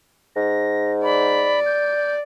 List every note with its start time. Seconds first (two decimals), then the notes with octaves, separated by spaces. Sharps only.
0.36 G#2 A#6
1.04 D5 B5
1.66 G6